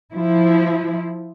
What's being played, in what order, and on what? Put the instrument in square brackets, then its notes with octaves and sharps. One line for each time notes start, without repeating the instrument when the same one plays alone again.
[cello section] F3 E4